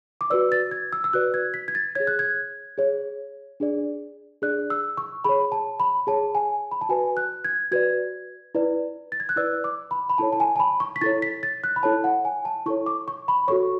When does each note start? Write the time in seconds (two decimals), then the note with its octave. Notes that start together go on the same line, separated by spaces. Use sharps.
0.21 D6
0.30 F#4 B4 D5 E6
0.52 A6
0.71 G#6
0.93 E6
1.04 E6
1.13 F#4 B4 D5 F#6
1.34 G#6
1.54 B6
1.68 G#6
1.75 A6
1.95 G#4 C#5 G#6
2.07 F#6
2.19 G#6
2.78 G#4 C#5
3.60 D4 G#4 D5
4.42 D4 G#4 D5 F#6
4.70 E6
4.97 C#6
5.24 G#4 C#5 B5
5.52 A5
5.80 B5
6.07 G#4 C#5 A5
6.35 G#5
6.71 B5
6.81 A5
6.89 F#4 B4 D5 G#5
7.17 F#6
7.45 G#6
7.71 F#4 B4 D5 G#6
8.55 E4 B4 D5
9.12 A6
9.20 G#6
9.29 F#6
9.36 E4 B4 D5 E6
9.64 D6
9.91 B5
10.09 B5
10.18 E4 A4 C#5 A5
10.33 A5
10.40 G#5
10.56 A5
10.60 B5
10.80 C#6
10.96 B6
11.01 E4 A4 C#5 A6
11.22 B6
11.43 A6
11.64 F#6
11.76 B5
11.83 E4 A4 C#5 A5
12.04 F#5
12.25 G#5
12.45 A5
12.66 E4 A4 C#5 C#6
12.86 D6
13.08 C#6
13.28 B5
13.48 F#4 A4 C#5 C#6